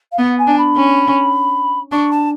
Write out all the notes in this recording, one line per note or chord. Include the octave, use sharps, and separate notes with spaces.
F5
B3 F#5
G#5
D4
B5
C#4
D4 C#6
A5